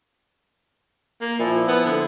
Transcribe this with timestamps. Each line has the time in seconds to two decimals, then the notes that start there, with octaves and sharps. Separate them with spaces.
1.21 A#3
1.39 A#2 F3 E4
1.68 B3
1.85 D3